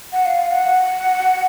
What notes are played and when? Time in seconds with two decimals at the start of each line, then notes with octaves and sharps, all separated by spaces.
0.13 F#5
0.26 F5
0.51 F#5